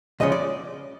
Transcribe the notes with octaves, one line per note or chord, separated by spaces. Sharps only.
D2 C#3 F3 G#3 C#4 D#5
D5